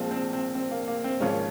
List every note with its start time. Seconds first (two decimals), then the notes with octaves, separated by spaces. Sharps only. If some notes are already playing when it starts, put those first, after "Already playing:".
Already playing: A#1 A#2 F3 G#3 C4
0.11 C4
0.33 C4
0.55 C4
0.71 A#3
0.88 A#3
1.04 C4
1.20 G#1 G#2 F3 G#3 A#3 C#4